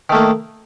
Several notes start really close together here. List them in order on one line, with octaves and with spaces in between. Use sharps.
D#3 A3 A#3